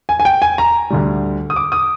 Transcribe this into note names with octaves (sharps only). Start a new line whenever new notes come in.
G#5
G#5
G5
G#5
A#5
D2 D3 G3
D#6
D6
D#6